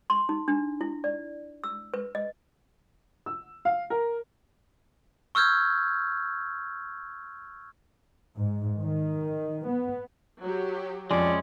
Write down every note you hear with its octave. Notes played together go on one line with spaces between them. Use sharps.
C6
D#4
D4
E4
D5
E6
B4
D#5
E6
F5
A#4
C#6 E6 F6 G6 G#6
G#2
D#3
B3
F#3 G4
F2 G#3 C#4 D5